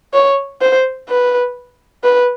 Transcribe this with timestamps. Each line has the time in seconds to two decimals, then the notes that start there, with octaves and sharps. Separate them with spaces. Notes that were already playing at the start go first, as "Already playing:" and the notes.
0.14 C#5
0.62 C5
1.08 B4
2.04 B4